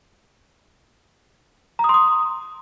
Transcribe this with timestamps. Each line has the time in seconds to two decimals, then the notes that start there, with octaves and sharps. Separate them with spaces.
1.79 A#5
1.84 D#6
1.89 C6
1.94 D#6